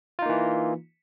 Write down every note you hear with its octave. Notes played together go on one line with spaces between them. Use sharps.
E3 A#3 D#4 F4